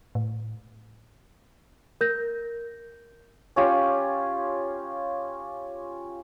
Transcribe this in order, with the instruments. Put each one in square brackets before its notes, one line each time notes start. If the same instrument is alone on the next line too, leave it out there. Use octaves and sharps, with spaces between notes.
[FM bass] A2
[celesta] A#4 G6 A#6
[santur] C#4 F4 G4